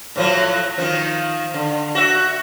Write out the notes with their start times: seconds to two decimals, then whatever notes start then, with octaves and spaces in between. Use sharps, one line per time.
0.16 A2 F3 F#3
0.78 D#3 F3
1.54 D3
1.95 F#4 E5